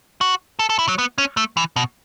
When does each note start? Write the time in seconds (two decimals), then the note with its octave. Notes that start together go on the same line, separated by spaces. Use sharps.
0.21 F#4
0.59 A4
0.70 A4
0.79 E4
0.88 F#3
0.99 B3
1.18 C#4
1.37 A3
1.57 E3
1.76 B2